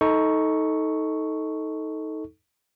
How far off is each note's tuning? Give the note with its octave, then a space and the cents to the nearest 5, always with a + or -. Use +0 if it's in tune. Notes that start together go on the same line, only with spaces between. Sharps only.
D#4 +20 A4 +0 C#6 +0